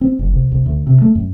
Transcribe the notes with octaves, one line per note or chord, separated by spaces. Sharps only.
C4
F#1
C2
C2
D2
C3
A3
F#2